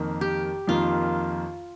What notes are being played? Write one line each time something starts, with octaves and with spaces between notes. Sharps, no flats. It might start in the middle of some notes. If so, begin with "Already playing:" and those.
Already playing: F2 D#3 A#3
G4
F2 D#3 A#3 F4